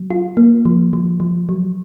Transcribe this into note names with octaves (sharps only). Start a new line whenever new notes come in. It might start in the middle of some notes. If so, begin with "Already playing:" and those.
Already playing: F#3
F4
A#3
F3
F3
F3
F#3